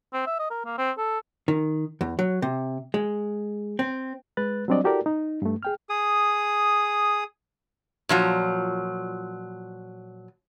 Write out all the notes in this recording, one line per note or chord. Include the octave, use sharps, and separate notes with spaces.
C4
E5
D#5
A#4
A#3
C4
A4
D#3
E2
F#3
C3
G#3
C4
G#3 B4 F#6 A6
F#3 G3 C4 D4 D5 D#5
E4 F#4 G4 A4 A#4 D5
D#4
G2 A3
G#4 G5 F6
G#4 D#6
A#2 F3 F#3